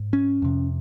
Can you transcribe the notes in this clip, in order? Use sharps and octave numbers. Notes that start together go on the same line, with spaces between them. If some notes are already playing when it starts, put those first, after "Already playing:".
Already playing: G#2
C#4
F2 C3